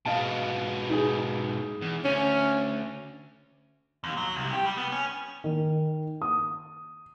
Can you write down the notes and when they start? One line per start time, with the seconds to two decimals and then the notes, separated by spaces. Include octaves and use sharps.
0.06 G#2 B2 D#5 F5 A5
0.90 D#4 G#4
1.81 E2
2.04 D2 C#4
4.04 D#2
4.17 F#3
4.36 C2
4.53 G4
4.65 G3
4.77 B3
4.92 C#4
5.44 D#3
6.22 D#6